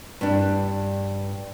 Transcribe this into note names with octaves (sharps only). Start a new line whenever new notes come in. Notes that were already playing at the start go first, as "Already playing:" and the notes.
G2 D4